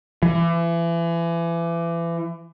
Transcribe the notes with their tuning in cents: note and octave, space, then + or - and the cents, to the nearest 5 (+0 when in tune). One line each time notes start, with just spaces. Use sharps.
E3 +35